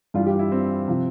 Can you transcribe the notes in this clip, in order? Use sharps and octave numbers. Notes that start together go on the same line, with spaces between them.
G2 E3 G3 F4
G4
E4
C4
C3 F3